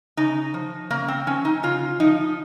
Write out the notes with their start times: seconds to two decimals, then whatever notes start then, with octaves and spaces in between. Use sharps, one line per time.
0.17 C#3 D#4
0.54 F3
0.90 C#3 A#3
1.08 C4
1.27 F3 C#4
1.45 D#4
1.63 C#3 F4
2.00 F3 D#4